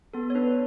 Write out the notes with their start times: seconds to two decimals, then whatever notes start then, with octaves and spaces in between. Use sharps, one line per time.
0.14 B3 A4
0.30 C#5
0.35 D4 B4